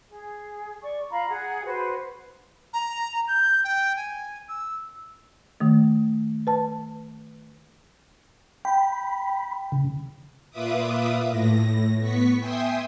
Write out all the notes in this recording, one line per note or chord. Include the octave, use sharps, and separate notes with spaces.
G#4
D5 C#6
F4 F5 A#5 B5
G#4 F#5
F#4 B4 C5
A#5
G6
G5
G#5
E6
D#3 A3
B4 A5
G5 B5
C#3
A#2 F4 B4 E5 D6 D#6
A2 A#6
B3 C#6 B6
E5 G5 G#5 C6 D#6